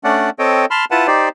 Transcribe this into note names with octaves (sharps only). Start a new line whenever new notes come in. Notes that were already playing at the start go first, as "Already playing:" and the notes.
A3 C#4 D4 D5 F#5
C4 A4 C#5 D#5 G5
A5 B5 C6 F6
E4 F4 B4 F#5 A5
D#4 G4 C5 D5